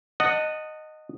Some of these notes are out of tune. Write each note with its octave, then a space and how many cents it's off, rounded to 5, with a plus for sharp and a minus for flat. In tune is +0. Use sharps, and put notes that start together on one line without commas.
D#5 -10 F#5 +0 A5 +30